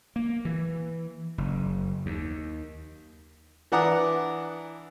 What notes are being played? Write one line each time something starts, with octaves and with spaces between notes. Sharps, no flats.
A#3
E3
F#1
D#2
E3 D4 F#5 A#5 D#6